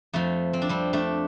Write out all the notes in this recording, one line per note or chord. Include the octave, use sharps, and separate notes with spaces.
F2 F3 A3
C4
D4
G3 C4
A3 D4